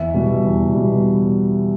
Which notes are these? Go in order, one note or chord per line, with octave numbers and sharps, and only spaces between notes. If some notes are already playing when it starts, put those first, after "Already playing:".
Already playing: E2 E5
B2 G3
E2
B2 G3